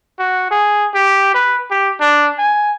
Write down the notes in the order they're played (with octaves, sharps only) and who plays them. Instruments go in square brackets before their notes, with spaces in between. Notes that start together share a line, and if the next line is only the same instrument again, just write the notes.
[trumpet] F#4
G#4
G4
B4
G4
D4
G#5